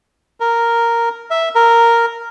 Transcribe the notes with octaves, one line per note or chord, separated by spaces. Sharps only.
A#4
E5
A#4